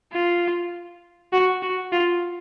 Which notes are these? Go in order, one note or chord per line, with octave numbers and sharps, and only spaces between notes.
F4
F#4
F#4
F4